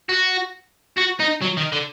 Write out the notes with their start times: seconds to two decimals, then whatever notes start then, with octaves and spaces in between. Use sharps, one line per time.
0.09 F#4
0.98 F#4
1.20 D#4
1.42 F#3
1.57 D#3
1.72 D3